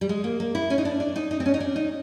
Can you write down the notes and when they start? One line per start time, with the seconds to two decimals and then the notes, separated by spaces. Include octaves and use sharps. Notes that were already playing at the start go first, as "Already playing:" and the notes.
0.01 G3
0.09 G#3
0.24 A#3
0.40 A#3
0.55 E4
0.70 C#4
0.78 D#4
0.85 D4
1.00 D4
1.16 D#4
1.31 D#4
1.40 C4
1.46 C#4
1.54 D#4
1.60 D4
1.76 D#4